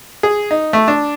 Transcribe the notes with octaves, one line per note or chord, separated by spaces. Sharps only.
G#4
D#4
A3
D4